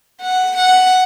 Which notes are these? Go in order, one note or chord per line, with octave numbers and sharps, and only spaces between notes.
F#5
F#5